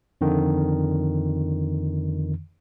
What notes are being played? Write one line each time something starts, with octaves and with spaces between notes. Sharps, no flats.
F2 D3 D#3